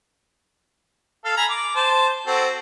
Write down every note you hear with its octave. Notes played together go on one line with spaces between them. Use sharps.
A4 F5
G#5 A#5 B5
D6
C5 A5
C4 F#4 A4